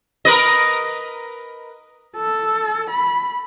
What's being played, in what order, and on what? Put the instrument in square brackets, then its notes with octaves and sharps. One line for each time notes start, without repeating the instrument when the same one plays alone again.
[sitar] A#4 B4 D#5
[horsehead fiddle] A4
B5